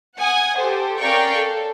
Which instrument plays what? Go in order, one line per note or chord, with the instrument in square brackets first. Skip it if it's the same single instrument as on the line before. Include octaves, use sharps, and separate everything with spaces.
[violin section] F#5 G#5 D#6
G4 A4 C5
C#4 A#4 D5 F5 G5 C#6
A4